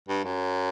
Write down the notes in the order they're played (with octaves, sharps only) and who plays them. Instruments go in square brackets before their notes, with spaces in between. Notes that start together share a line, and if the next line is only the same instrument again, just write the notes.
[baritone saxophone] G2
F#2